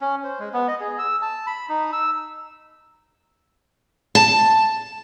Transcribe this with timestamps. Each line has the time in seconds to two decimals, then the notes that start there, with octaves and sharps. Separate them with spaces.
0.01 C#4
0.24 C5
0.39 G#3
0.53 B3
0.68 D#5
0.80 G#4
0.99 E6
1.22 A5
1.47 B5
1.69 D#4
1.93 E6
4.15 A5